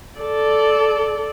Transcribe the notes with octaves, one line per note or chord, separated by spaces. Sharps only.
A4 D5